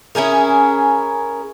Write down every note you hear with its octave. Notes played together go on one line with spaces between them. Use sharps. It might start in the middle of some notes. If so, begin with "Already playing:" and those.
C#4 E4 G#4 A#4